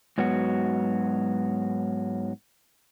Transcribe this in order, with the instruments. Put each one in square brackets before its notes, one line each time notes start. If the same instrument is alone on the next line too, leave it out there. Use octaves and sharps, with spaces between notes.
[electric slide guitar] G#2 F#3 B3 F#4